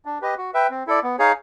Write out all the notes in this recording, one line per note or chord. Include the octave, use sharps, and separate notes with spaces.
D4
G4 B4 D#5
F#4
B4 E5 G5
C4
E4 A4 D5
B3
D#4 G#4 C#5 F5